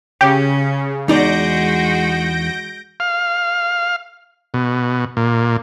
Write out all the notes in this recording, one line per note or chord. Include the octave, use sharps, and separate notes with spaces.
C#3 C#4 G4
E2 G#3 D#4 F#4 D5 G6 A#6 D7
F5
B2
A#2